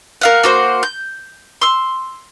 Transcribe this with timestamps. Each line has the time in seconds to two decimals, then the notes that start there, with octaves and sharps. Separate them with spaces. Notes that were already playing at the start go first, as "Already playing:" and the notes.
0.21 A#4 F5 F#5
0.44 A#3 F#4 C5
0.83 G6
1.62 C6 E6